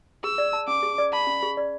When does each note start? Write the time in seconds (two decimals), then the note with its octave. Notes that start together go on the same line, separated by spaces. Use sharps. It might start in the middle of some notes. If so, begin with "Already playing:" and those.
0.24 G#4 E6
0.38 D5
0.53 A5
0.67 C#4 D6
0.83 G#4
0.98 D5
1.13 A5 B5
1.27 C#4
1.43 G#4
1.57 D5